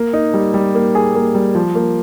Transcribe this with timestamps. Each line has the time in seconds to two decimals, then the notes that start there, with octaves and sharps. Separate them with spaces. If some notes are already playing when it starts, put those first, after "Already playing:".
Already playing: A#3
0.13 D#4
0.34 G3
0.54 G3
0.75 A#3
0.95 G#4
1.15 A#3
1.35 G3
1.55 F3
1.75 A#3